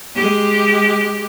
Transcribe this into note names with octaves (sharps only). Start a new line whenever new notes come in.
G#3 G4